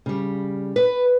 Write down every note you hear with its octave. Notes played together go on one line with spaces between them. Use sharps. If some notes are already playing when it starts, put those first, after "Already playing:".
C#3 G3
B4